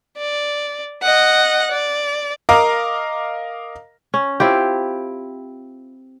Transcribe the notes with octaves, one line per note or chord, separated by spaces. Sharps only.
D5
D#5 F#5
D5
A#4 D#5 F5 A#5 D6
C#4
C4 E4 F4 G4